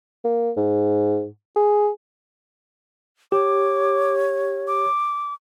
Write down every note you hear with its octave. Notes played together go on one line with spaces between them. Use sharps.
A#3
G#2
G#4
G4 C#5 D6
D6